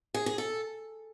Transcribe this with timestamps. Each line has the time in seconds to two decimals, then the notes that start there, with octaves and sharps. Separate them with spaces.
0.14 G#4
0.26 G#4
0.38 A4